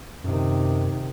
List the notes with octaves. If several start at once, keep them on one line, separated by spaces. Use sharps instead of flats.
F#2 C3 D#3